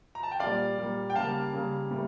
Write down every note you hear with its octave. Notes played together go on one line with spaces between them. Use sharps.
A#5
A5
G5
A#2 G3 A#3 D5 F5
A#2 G3 A#3
G5
C#3 G3 A#3 F5 A5
C#3 G3 A#3
A2 G3 A#3